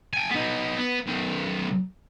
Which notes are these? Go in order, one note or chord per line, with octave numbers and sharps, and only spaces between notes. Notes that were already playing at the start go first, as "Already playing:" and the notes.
G5 G#5
B3 D#4
B3
B1 D#3